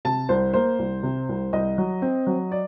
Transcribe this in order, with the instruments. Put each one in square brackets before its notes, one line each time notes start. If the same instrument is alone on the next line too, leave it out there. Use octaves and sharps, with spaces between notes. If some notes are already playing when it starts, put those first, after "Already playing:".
[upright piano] C3 A5
C2 C5
A#3 C5
C2
C3
C2
C2 D#5
F#3
C4
F#3
D5